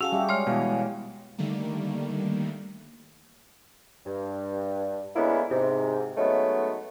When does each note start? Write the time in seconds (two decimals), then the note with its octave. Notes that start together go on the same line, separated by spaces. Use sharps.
0.01 C#4 F#4 G#4 F5 F#5 A5 E6
0.12 G3 G4 E5
0.29 G#3 C#5 C6 F6
0.47 B2 E3 F5
1.38 D3 D#3 G3 A3 A#3
4.06 G2
5.16 D3 G#3 A#3 B3 C#4 E4
5.51 G#2 C3
6.17 F#3 G#3 A3 B3 C#4 D#4